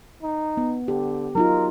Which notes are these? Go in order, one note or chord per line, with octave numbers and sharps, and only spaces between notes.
D#4
B3
D3 G4
F#3 D#4 F4 A#4